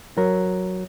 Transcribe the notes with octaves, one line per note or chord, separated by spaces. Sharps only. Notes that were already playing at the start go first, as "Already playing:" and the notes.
F#3 A#4